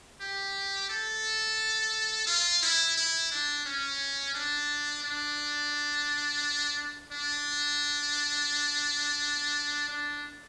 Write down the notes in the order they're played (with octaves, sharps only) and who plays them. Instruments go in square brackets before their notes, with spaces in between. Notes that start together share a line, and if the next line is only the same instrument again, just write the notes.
[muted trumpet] G4
A4
F4
E4
E4
D4
C#4
D4
D4
D4
D4